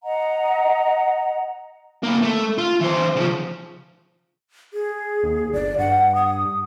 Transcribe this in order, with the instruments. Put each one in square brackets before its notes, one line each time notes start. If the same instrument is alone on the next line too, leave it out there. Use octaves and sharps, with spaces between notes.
[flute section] D#5 F#5 A#5
[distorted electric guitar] A#3 E4
A3
F4
E3 C5
C#3 F3
[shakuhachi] G#4
[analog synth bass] D#2
[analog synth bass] G1 [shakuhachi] D5
[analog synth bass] G2 [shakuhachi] F#5
[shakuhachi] D#6